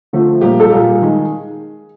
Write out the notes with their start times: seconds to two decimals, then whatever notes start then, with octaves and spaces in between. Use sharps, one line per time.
0.13 D3 F3 A3 C4
0.41 A#2 G3 A#3 G4
0.60 A4
0.71 A#2 G3 A#3 G#4
1.01 D#3 G#3